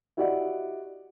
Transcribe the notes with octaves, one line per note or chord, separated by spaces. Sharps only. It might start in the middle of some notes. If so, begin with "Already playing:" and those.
E4 F#4 G4 D5 D#5 F#5